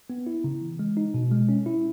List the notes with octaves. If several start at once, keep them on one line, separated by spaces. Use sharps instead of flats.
B3
E4
C#3
E3
G#3
D#4
B2
G#3
C#4
E4